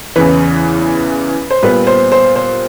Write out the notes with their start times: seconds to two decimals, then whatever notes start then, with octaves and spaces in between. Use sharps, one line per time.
0.16 E2 C#3 E3 B4
1.51 C5
1.63 A#2 G3 B3 B4
1.87 C5
2.12 C5
2.36 C5